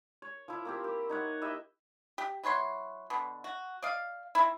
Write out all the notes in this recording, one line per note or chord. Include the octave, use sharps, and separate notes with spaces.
C#5
F3 E4
A#3 C4 G4
G4
D#4 C#5 F#5
E4 G4 D#5 E5
G4
E3 F#3 C#5 C6
B2 D3
F#4
D5 D#5 F5
C4 E4